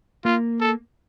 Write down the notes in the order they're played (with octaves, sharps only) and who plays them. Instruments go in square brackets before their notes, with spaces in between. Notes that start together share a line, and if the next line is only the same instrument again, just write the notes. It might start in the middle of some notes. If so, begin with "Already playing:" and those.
[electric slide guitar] A#3 [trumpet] F4
[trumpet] A4